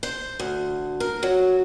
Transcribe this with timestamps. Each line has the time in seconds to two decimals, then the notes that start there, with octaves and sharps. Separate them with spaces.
0.03 C5
0.39 D2
1.00 A#4
1.23 F#3